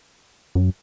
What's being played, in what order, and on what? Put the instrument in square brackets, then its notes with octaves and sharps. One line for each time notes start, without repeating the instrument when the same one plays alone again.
[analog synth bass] F#2